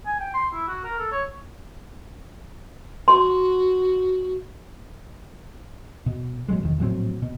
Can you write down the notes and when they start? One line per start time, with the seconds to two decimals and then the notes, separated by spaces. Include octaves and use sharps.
0.06 G#5
0.20 G5
0.34 C6
0.53 E4
0.68 F#4
0.84 A#4
0.99 A4
1.12 C#5
3.08 F#4 C6
6.06 B2
6.49 G#1 B2 F#3 G#3
6.63 F1 E2 D#3
6.78 A#1 A2 F#3 C4
7.22 B2